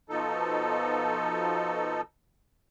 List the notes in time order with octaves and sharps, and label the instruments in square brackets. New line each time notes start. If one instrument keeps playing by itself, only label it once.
[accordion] B2 F3 D#4 A4